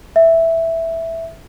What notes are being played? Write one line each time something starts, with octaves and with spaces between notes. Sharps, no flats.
E5